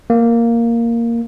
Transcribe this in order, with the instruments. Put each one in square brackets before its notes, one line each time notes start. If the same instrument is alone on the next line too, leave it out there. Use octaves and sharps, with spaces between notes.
[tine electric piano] A#3